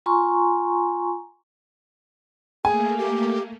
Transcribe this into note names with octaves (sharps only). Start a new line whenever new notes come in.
F4 G#5 A#5 C6 C#6
A3 A#3 G#4 G#5
G4